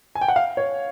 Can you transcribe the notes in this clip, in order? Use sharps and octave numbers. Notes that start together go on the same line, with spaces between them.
G#5
G5
F#5
F5
C#5